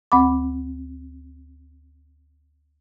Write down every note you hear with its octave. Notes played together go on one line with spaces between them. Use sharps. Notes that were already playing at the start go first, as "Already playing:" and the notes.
D2 C4 F#5 B5 D6